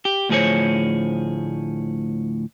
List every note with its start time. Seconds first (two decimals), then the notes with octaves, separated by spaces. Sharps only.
0.05 G4
0.29 D2 A2 F3 G#4 C5 C#5